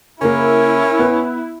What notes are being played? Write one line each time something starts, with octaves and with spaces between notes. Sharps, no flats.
C#3 A#3 C#4 E4 A#4
B3 B4